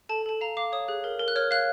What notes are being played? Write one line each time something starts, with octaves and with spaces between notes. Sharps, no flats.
A4 A5
A4 A5
F5 A#5
F5 D6
C#5 D#6
G#4 F#6
A#4
A#4
F#6
C#5 F6
F5 F#6